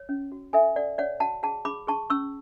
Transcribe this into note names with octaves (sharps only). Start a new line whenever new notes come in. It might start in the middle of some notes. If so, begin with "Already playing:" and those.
Already playing: C#5
C#4
F#4
A4 E5 G#5
A4 D5 F#5
C#5 D5 F#5
F#4 F#5 A5
G#4 F#5 A5
G#4 B5 D6
G#4 A5 C#6
C#4 C#6 E6